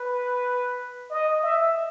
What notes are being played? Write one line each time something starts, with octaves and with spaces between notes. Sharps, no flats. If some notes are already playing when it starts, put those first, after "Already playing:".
Already playing: B4
D#5
E5